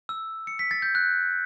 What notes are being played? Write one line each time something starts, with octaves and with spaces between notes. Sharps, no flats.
E6
C#7
B6
A6
G6
F#6